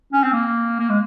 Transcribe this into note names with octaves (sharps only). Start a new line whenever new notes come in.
C#4
C4
A#3
A#3
G#3